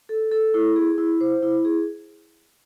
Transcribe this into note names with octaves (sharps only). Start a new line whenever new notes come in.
A4
A4
E4
G#4
E4
C5
E4
G#4